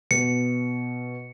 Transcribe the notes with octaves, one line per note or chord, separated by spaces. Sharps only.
B2 C#7